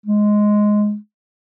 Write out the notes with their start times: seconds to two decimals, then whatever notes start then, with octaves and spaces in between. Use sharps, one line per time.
0.06 G#3